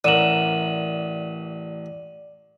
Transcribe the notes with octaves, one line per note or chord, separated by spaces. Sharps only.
A1 A#4 D5 E5 F#5 D#7 E7 F#7